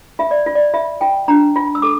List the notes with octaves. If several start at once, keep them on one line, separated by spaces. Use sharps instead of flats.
F4 E5
D5
F4
D5
F4 E5
F4 G5
D4 A#5
F4
E6
A4 D6